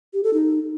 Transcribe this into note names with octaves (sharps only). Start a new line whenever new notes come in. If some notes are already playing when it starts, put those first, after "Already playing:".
G4
A4
D#4